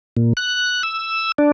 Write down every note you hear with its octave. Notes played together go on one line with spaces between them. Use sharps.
A#2
F#6
E6
D4